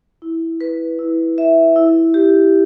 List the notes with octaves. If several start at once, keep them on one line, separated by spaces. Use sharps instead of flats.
E4
B4
E4
E5
E4
G4